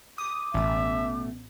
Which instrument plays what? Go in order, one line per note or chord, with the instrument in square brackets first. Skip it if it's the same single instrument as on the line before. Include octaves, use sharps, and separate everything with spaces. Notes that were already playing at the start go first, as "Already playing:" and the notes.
[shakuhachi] D6 [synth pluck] D#6
[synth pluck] A1 [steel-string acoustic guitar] B2 A3 [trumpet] E5